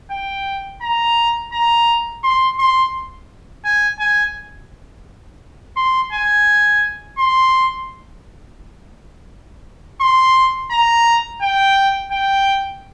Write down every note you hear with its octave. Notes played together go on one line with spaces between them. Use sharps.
G5
A#5
A#5
C6
C6
G#5
G#5
C6
G#5
C6
C6
A#5
G5
G5